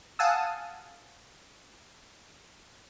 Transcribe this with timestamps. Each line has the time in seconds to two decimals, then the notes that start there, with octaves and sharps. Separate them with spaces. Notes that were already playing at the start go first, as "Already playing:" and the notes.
0.19 F5 F#5 G#5 A5 D#6 E6